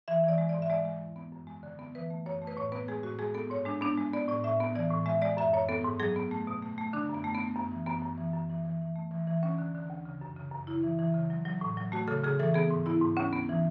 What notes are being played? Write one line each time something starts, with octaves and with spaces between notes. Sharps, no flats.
E3 E5
E3 D5
G#3
D5
G#2
E5
G#3 D5
G#3
E2
B3
F#2
G#3
D3
B3
E3 B4
A3
F#2 C#5
A3
B4
A2 C#5
B3 B4
G#3 G#4
A2 F#4
G#3 G#4
B3 A4
G#2 C#5
G#3 D4
B3 D4
G#3
B3 D5
A2 D5
A2 E5
B3
E3 D5
A2
G#3 E5
G#3 D5
F#2 E5
F#2 C#5
B3 A4
G#2
F#3 G#4
B3
A3
B2
A3
A3
D3 D4
F#2
B3
A3
B3
A3
F#2 B3
E3
F#2 B3
F#2
E3
F#2
E3
E3
E3
A3
E3
E3
D2 C#4
D3
D3
D2
C#3
F#2
C#3
F#2
C#3 E4
E3
E3
C#3
F#3
F#3
A2
F#3
A3 F#4
C#3 A4
C#3 G#4
E3 A4
B3 G#4
G#2
B3 E4
G#2
D2 C#4
B3
E3